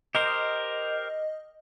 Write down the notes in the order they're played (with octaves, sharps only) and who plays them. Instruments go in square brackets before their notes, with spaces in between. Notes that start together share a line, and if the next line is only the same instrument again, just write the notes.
[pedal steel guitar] G4 A#4 C5 [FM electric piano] D#5